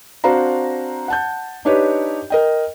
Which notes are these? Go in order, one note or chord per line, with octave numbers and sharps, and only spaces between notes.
C4 D4 F#4 C5 F5 A#5
F#5 A5 G6
D4 D#4 G4 B4 C#5 D#5
A#4 D#5 G5